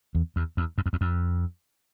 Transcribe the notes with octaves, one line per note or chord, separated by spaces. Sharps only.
E2
E2
E2
F#2
F2
E2
F2